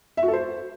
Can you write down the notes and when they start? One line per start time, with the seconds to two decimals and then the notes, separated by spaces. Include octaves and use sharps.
0.17 E5
0.23 F#4
0.28 A4
0.33 C5